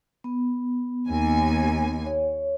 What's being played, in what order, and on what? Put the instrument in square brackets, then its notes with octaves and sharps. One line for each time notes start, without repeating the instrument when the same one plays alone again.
[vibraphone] B3
[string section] D#2 G#5
[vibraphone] C#5